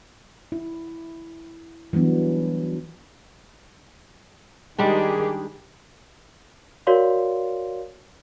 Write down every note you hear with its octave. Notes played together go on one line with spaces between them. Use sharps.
E4
E3 F#3 G3 B3 D4
D#3 G3 G#3 D4 G4 G#4
F#4 A#4 C#5 D5 F5 C6